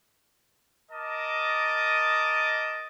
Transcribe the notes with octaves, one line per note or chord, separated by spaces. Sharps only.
A#4 D#5 A5 D6 D#6